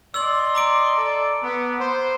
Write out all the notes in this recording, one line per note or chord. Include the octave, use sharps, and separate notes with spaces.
D5 D#5 C6 E6 F#7
A#5 D6 D7
A4 D5
B3
C5